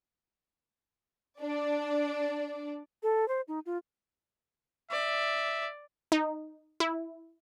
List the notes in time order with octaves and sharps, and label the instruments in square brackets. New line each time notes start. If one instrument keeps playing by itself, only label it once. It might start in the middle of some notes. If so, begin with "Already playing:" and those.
[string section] D4 D5
[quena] A4
C5
D#4
F4
[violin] D5 [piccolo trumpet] E5
[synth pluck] D#4
E4